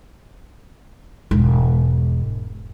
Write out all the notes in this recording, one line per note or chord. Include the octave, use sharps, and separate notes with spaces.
E1 G#2